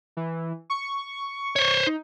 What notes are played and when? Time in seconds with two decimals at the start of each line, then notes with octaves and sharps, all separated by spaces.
0.17 E3
0.70 C#6
1.56 C5 C#5
1.86 D#4